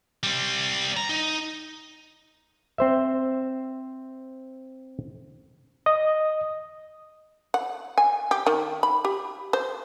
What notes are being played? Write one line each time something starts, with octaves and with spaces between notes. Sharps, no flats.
G3 C4
A#5
D#4
C4 C5 E5
D#5 D#6
F#5
G#5
G4
D#3
B5
G4
C5